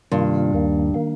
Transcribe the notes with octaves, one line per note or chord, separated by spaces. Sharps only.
G2 C3 D#3 A#3 F4
D#2 D#3 A#3
D#3 A#3